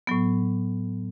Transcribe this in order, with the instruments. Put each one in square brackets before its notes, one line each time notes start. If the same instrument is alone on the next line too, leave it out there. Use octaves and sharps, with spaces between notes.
[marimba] A2 F#3 B3